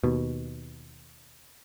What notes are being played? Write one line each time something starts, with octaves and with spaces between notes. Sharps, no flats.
D#2 B2